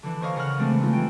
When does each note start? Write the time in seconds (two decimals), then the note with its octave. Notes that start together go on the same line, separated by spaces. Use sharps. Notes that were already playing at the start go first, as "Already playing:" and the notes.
0.03 D3 E3
0.21 C5 C#5 D#5 F5 C#6
0.36 C#3 A#4 C#5 F#5 F6
0.59 C#3 E3 G#3 A3 C4 D4
0.79 G3 A3 D#4 F4
0.93 E3 G5